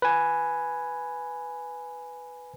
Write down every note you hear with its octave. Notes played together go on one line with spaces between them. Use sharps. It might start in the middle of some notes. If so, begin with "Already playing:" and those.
B4 G#5